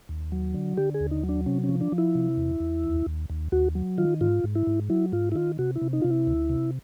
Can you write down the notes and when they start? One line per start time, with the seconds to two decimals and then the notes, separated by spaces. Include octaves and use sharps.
0.09 D#2
0.32 F#3
0.54 D3
0.77 D3 G4
0.94 G#4
1.00 D#2
1.11 D#4
1.23 F#3
1.29 D4
1.46 C3 C#4
1.64 C#4
1.69 F3
1.81 D4
1.92 F3
1.98 E4
2.15 C3
2.37 E2
2.60 E2
2.84 D#2
3.06 D#2
3.30 D#2
3.52 D#2 F#4
3.75 F#3
3.98 D#3 F4
4.21 G#2 F4
4.44 G#2
4.55 E4
4.67 G#2
4.90 F#3 E4
5.13 G#2 F4
5.32 E4
5.35 D#3 F4
5.59 C3 F#4
5.75 E4
5.82 C3
5.93 D#4
6.02 C3 F4
6.10 E4
6.27 D2
6.50 C3